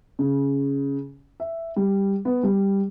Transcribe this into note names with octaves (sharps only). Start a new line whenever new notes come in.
C#3
E5
G3
B3
G3